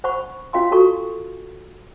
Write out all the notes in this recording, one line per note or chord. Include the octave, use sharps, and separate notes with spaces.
C5 F#5 B5 C#6
C#4 F4 F5 G5 C6
F#4 A4 A#5 C#6